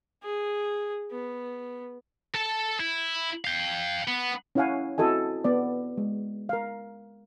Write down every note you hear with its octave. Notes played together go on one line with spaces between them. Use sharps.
G#4
B3
A4 A5
E4
F5 G5
B3
C#4 E4 C#5 F5 F#5 G#5
C4 E4 F#4 A4 D#5 G#5
B3 D5
G#3
A#4 F5